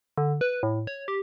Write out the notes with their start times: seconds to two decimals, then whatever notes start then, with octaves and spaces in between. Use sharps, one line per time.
0.17 D3
0.41 B4
0.63 A2
0.87 C#5
1.08 G4